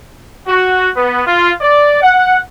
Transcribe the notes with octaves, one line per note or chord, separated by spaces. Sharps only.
F#4
B3
F4
D5
F#5